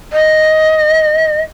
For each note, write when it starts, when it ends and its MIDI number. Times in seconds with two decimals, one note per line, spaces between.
0.13 1.42 75